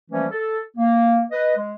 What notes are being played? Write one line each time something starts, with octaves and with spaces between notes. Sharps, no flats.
E3 F3 G3 A3 A#3 C#4
A4
A#3
B4 D#5
G#3